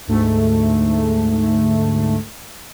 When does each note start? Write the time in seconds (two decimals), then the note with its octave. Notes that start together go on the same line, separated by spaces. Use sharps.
0.07 D2 G#2 A3